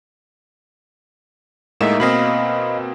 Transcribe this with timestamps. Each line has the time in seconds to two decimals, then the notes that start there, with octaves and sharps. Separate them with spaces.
1.81 A2 G#3 A#3 D#4 E5 E7
2.00 B2 A#3 C4 D#5 F5 B5